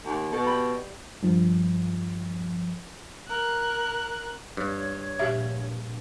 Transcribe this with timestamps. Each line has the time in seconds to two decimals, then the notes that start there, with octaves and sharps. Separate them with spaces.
0.05 D#2
0.32 B2 A4
0.47 G4 D5 B5
1.23 G2 F3
3.28 A#4 F#6
4.57 G2 C#5
5.19 A#1 G4 E5